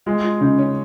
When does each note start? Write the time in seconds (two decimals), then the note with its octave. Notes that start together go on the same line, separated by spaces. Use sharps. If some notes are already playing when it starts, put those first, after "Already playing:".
0.06 G#3 F4
0.23 F4
0.41 C#3 D#4
0.58 C#4